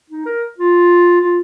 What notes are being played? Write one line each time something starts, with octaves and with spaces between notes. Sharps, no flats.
D#4
A#4
F4
F4